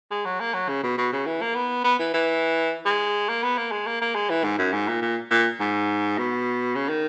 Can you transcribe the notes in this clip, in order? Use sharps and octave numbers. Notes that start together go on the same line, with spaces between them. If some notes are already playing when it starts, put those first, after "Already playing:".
G#3
F#3
A#3
F#3
C#3
B2
B2
C#3
E3
A#3
B3
B3
E3
E3
G#3
A#3
B3
A#3
G#3
A#3
A#3
G#3
E3
G#2
F#2
G#2
A#2
A#2
A#2
G#2
B2
C#3
D#3